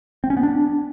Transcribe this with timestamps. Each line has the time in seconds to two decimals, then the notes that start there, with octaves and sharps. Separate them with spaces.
0.24 C4
0.30 C#4
0.37 B3
0.43 D4